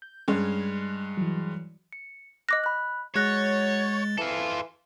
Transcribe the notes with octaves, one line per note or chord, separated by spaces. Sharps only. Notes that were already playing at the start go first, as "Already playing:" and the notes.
G6
G2 G#3 C#4 F6 G#6
F#6
E3 F#3
C#7
D#5 D6 F#6 A#6
B5 F#6
F#3 G#3 G#4 C#5 F#6 A6 A#6
E3 F4 A4